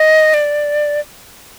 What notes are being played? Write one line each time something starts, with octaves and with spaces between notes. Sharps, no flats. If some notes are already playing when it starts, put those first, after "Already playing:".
Already playing: D#5
D5